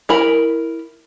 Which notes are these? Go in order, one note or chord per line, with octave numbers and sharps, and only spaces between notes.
E4 A#4 B5